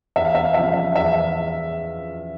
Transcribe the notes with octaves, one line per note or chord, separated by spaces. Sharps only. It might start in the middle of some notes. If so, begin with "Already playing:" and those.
E2 E5
F5
E5
F5
C#3 F3 E5
F5
E5
E2 E5